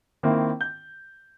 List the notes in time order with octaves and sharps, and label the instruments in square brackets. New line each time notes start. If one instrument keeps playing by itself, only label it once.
[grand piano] D#3 A#3 C4 E4
G6